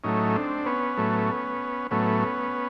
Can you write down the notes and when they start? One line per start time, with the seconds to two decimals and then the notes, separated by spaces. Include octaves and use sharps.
0.04 A2 F#3 A3 C#4 D#4
0.35 C4 D4
0.66 B3 C#4
0.97 A2 F#3 A3
1.91 A2 F#3 A3 B3 C#4